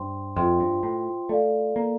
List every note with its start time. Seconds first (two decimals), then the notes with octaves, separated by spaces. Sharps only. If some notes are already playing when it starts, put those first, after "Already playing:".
Already playing: G2 C5 G5 C6
0.36 F2 F4 C5 E5 G5 C6
0.60 G2
0.83 A2
1.29 A3 A4 D5 F5
1.76 A#3